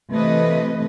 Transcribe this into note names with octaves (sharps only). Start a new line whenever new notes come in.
C3 E3 A3 B4 D#5